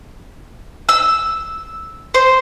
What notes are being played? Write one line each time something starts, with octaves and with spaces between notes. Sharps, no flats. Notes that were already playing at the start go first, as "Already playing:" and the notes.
E6
C5